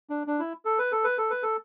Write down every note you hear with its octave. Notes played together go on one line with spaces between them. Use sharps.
D4
D4
E4
A4
B4
A4
B4
A4
B4
A4